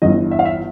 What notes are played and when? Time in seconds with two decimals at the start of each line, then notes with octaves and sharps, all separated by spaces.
0.02 G1 G2 E3 D#5
0.31 E5
0.39 F5
0.45 E5